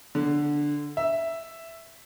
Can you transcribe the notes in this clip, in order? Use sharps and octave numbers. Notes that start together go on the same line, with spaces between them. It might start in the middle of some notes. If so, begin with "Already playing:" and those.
D3
E5